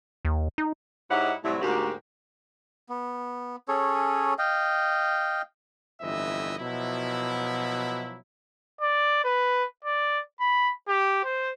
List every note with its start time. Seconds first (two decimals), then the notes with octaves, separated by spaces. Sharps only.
0.25 D#2
0.58 D#4
1.11 G#2 D#4 E4 G4 C#5 F#5
1.44 A2 C3 F#3 G3 E4
1.61 D2 G#2 A#3 F#4 G4
2.89 B3
3.68 C#4 G#4 A4 C#5
4.39 D#5 F5 G5
6.01 G1 F2 E3 D#5 E5
6.59 B2 F3 F#3 E4
8.81 D5
9.24 B4
9.85 D5
10.40 B5
10.88 G4
11.24 C5